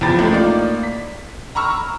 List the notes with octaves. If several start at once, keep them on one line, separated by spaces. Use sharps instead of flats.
E2 F3 F4 G5 B5 A6
C#2 A2
A2 A#3 D#4 F4 D5 D6
B6
A#5 B5 C#6 E6 F6